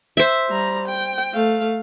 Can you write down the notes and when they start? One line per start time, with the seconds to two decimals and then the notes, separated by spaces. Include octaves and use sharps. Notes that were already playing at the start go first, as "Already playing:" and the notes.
0.17 C5 E5
0.50 G3 A#5
0.88 G5
1.33 A3 F5